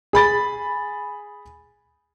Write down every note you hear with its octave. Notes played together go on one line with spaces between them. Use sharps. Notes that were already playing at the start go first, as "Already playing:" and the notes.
G#4 B5 A6